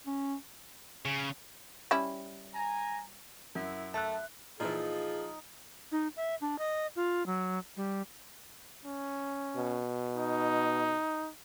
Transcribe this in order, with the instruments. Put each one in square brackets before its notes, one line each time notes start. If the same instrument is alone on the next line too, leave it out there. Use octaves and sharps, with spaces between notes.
[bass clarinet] C#4
[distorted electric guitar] C#3
[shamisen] G3 C#4 E4
[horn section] G#5 A#5
[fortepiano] F#2 [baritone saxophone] E4
[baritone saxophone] A3 [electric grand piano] E5 F#6 [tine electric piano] A5
[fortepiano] A#2 E3 [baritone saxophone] F3 [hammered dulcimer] D#4 [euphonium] G#4
[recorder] D#4
E5
D4
D#5
F4
F#3
G3
[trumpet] C#4
[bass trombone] B2
[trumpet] D#4